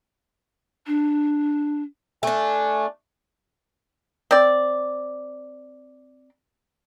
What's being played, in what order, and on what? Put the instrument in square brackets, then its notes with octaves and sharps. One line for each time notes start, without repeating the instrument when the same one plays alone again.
[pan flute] D4
[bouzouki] A3 D4 [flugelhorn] G#5
[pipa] C4 D5